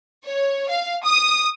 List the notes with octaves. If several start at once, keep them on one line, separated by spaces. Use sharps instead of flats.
C#5
F5
D#6